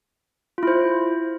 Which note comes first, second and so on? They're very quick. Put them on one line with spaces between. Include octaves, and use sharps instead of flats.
F4 E4 C5